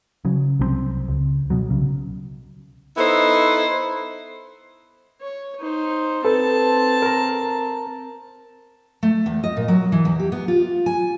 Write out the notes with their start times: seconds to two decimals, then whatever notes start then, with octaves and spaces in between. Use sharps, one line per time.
0.25 C#3 F#3
0.59 C2 F#3 C4
1.09 C#2
1.50 B2 F#3
1.70 C2 C#3
2.97 B3 D#4 E4 A4 C5
5.21 C#5
5.60 D#4 C5
6.25 C4 A4 B4 A5
7.02 A#4 A#5
9.03 A3
9.26 E2
9.44 D#5
9.57 A#2
9.68 F#3
9.92 E3
10.05 E2
10.19 G4
10.32 B3
10.48 F4
10.86 G#5